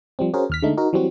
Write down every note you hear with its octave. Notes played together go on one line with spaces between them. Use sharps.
F3 G3 C4
C#4 F#4 G#4 A#4 C5
D#2 F6 B6
D3 G#3 A3 D#4
D#4 F#4 A#4
E3 F#3 G3 C4 F#4